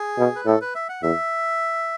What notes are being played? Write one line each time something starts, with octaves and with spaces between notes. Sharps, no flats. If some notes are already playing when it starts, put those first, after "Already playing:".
Already playing: G#4
B2
B4
A2 A4
B4
E5
F#5
E2 E5